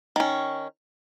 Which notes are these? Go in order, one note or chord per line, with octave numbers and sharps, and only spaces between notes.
D#3 C#4